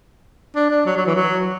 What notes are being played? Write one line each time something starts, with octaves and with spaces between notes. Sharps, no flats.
D4
D4
F#3
F#3
E3
F#3